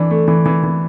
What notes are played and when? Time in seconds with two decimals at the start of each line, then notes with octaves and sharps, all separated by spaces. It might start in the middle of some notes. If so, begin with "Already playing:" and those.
Already playing: E3 D4
0.11 A3
0.28 E3
0.46 E3
0.63 E3